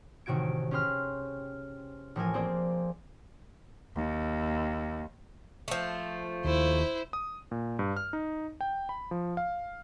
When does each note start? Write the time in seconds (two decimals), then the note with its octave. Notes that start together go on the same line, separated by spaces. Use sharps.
0.26 A1 C3 D#3 F#4 G#6 D7
0.71 C#4 G4 G#4 C6 F6
2.16 A1 F3 A#4 G#5
2.34 A#3 C4 G#4 C5 D5
3.95 D#2
5.68 F3 A3
6.45 D#2 E4 C5
7.13 D#6
7.51 A#2
7.79 G2
7.97 F6
8.13 D#4
8.61 G5
8.89 B5
9.11 F3
9.37 F5